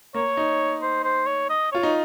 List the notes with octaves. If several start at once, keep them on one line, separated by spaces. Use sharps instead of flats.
A#3 C#5
D#4
C5
C5
C#5
D#5
F4 C#5
D#4